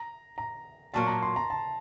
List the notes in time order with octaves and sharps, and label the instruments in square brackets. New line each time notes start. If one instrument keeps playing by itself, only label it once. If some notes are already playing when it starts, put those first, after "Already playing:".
Already playing: [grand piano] A#5
A#5
[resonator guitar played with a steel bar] A#2 F#3 A#3 [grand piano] A5
[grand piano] A#5
C6
A#5
A5